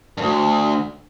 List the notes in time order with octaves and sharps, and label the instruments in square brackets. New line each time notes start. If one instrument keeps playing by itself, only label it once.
[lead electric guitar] D2 G2